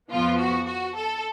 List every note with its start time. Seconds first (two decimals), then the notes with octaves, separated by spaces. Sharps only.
0.10 F2 F3 B3 F4
0.39 F#4
0.67 F#4
0.95 A4